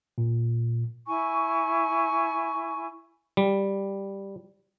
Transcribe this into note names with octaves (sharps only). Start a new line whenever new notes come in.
A#2
E4 G#5 C#6
G3